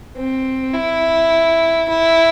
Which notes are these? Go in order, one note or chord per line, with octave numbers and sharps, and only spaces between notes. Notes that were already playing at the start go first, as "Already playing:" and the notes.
C4
E4
E4